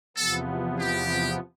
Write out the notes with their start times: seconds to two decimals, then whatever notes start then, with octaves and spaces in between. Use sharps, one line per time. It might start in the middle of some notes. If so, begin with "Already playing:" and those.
0.17 E2 C3 F3 B3 A4
0.79 G4